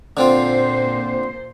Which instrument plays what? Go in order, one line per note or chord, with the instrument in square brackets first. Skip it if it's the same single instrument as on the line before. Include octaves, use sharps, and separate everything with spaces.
[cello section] A#2 C5 [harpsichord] D3 C4 F4